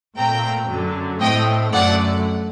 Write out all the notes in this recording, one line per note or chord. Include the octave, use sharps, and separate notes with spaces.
A#2 A3 C4 G5 A#5
F#2 D3 F#3
A2 A3 C4 D#5 G5
F#2 D3 A3 D5 F#5